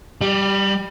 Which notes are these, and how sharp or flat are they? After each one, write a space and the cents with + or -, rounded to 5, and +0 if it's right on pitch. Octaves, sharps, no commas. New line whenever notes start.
G3 +0 D5 +40